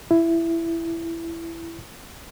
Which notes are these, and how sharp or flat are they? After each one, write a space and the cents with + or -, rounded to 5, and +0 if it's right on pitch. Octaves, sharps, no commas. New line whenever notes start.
E4 +10